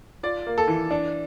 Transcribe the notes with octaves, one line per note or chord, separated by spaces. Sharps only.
F4 D5
A#3
A4
E3
D4